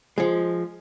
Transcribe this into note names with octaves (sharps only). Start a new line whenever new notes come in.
F3 G#3